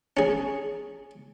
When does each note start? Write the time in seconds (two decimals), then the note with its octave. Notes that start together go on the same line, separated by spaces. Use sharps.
0.17 C#4 G#4